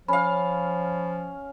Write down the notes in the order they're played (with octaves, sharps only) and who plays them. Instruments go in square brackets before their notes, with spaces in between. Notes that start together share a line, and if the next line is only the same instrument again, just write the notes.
[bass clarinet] F3 [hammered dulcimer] C#4 F5 [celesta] B5